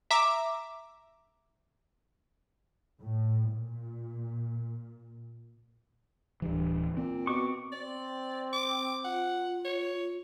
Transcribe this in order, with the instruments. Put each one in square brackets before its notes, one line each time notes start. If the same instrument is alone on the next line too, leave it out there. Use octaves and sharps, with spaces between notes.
[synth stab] E5 A#5 D6
[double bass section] A2
A#2
[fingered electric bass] D1 E3 [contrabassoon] G2
[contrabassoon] A#2 [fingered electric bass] C4
[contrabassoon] B2 [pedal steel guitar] C#6 D6
[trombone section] C4 [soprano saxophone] D5
[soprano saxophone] D6
[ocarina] F4 [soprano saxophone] F#5
[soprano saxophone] C#5